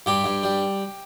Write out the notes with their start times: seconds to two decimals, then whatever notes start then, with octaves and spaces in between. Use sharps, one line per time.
0.06 G2 G4
0.24 G2
0.43 G3